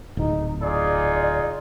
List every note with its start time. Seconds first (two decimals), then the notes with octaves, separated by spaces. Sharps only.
0.17 D1 G#2 D#4
0.62 D#4 F4 G#4 D5